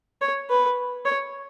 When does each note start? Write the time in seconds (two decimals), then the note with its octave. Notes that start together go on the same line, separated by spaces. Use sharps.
0.21 C#5
0.50 B4
1.05 C#5